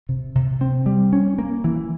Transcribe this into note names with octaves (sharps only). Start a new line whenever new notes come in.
C3
C3
C4
G3
C#4
A#3
E3